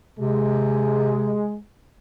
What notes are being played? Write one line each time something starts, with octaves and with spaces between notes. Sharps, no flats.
C3 G#3